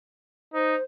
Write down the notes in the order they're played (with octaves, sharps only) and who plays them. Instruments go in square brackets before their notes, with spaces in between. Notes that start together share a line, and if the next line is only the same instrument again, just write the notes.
[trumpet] D#4 [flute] C5